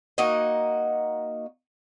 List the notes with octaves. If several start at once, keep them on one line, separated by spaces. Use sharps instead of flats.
A#3 D#4 F#4 D#5